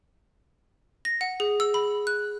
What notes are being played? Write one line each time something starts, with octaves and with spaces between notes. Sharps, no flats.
A#6
F#5
G#4
E6
B5
F#6